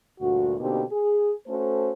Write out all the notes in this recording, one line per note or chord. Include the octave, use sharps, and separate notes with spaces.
D2 G2 A#2 F#4
B2 D3 A#3 C4 D#4 G4
G#4
A3 C#4 F#4 A4 C5